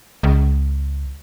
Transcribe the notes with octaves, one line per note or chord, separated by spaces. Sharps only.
C#2